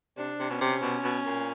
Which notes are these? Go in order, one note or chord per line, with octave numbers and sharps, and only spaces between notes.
C3 D4
C3
B2 C#4
C3
B2
B2
A#2